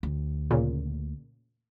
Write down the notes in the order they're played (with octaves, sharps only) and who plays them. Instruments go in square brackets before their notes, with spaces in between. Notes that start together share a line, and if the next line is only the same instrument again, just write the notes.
[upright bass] D2
[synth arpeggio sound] A#2 C#3